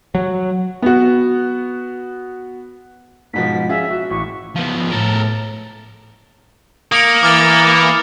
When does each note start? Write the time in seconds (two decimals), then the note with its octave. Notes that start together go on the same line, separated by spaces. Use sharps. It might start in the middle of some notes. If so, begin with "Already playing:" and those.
0.15 F#3
0.82 B3 F#4
3.34 G#2 B2 F3 B6
3.69 C#4 F4 G#4 E5
3.91 F#4
4.10 A1 C#6
4.56 F3 B3
4.91 A2 A4 A#4
6.92 A#3 D#6 C#7
7.23 E3 D6 F6 A6